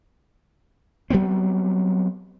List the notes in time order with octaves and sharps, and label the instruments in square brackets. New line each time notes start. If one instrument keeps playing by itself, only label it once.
[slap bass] F#3 G3 B3 C4